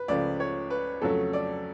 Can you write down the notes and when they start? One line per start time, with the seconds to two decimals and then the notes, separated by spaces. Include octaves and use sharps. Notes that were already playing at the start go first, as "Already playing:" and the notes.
Already playing: B4
0.08 C#2 C#3 F3 A3 D5
0.40 C#5
0.70 B4
1.02 F2 C#3 F#3 A3 A4
1.33 D5